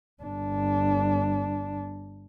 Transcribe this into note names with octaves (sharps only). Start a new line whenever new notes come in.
G1 D4